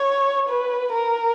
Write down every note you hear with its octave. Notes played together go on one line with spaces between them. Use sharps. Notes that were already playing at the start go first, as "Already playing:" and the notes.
Already playing: C#5
B4
A#4